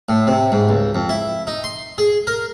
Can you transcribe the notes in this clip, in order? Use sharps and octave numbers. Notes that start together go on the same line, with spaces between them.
A2
C3
G#2
C#2
F2
E4
D#4
C6
G#4
A#4